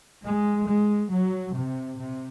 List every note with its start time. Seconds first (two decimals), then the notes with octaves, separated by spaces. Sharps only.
0.23 G#3
0.66 G#3
1.10 F#3
1.53 C3
1.98 C3